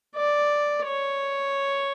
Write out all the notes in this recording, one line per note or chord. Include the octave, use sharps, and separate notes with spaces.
D5
C#5